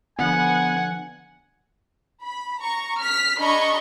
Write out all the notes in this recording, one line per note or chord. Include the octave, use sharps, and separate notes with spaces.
D3 F3 B3 F#5 G#5
B5
A#5 C#6
F6 B6
D4 G#4 D#5 A#5 B5 C#6